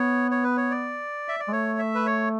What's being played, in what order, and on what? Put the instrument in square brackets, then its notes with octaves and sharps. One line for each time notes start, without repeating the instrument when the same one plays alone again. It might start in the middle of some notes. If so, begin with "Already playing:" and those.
Already playing: [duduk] B3 [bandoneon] C#5
[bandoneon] C#5
B4
C#5
D5
E5
D5
[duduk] G#3
[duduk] A3 [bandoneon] C#5
[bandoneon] E5
B4
C#5